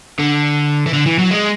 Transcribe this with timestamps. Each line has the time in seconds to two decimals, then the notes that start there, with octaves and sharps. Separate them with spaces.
0.19 D3
0.87 E3
0.94 D3
1.06 E3
1.19 F#3
1.31 G#3